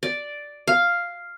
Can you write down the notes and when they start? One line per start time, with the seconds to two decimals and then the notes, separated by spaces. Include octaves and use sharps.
0.03 D5
0.67 F5